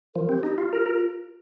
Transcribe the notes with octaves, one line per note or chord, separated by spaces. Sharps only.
F3 A#4
C4 G4
D#4 G4
F4 G4
F4 A#4
G4
F4 A#4